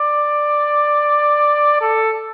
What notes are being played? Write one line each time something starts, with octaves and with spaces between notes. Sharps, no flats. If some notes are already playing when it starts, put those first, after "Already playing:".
Already playing: D5
A4